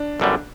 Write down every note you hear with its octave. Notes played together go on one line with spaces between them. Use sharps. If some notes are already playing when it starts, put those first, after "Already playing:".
Already playing: D4
G1 F#2 D3 G3